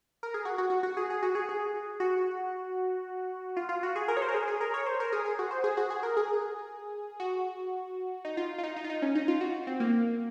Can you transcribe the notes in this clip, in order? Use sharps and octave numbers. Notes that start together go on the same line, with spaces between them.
A#4
G#4
F#4
F#4
F#4
F#4
G#4
G#4
F#4
G#4
G#4
F#4
F4
F4
F#4
G#4
A#4
C#5
C5
A#4
G#4
G#4
A#4
C#5
C5
A#4
G#4
G#4
F#4
C5
G#4
F#4
G#4
A#4
G#4
F#4
D#4
F4
F4
D#4
D#4
F4
D#4
C#4
D#4
F4
F#4
C4
A#3